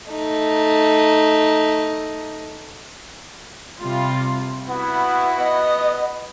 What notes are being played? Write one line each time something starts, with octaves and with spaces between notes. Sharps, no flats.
A3 D#4
C3 G3 F4
B3 E4 F#4
B3 D#5